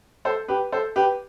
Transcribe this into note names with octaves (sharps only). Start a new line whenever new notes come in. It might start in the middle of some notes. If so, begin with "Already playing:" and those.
A4 C5
G4 B4
A4 C5
G4 B4